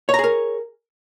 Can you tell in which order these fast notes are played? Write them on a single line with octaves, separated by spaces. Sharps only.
C#5 A#5 G#4 A#4